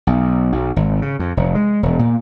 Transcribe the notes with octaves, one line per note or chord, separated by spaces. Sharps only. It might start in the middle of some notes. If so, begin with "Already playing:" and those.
B1
B1
G#1
C#3
F2
F1
G#3
E1
A#2